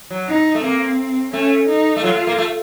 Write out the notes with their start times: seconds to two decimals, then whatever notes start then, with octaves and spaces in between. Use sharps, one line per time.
0.11 F#3
0.28 D#4
0.55 A3
0.64 A#3 C4
1.33 A3 C#4
1.69 D#4
1.96 A3
2.04 F#3 F4
2.16 A3
2.27 A#3
2.38 A3